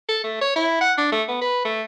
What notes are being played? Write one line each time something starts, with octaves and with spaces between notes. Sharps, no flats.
A4
A3
C#5
E4
F#5
D4
A3
B3
B4
A3